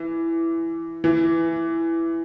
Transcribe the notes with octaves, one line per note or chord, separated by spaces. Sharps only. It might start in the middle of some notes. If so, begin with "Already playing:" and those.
Already playing: E3
E3